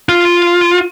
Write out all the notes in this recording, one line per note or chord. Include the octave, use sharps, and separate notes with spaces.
F4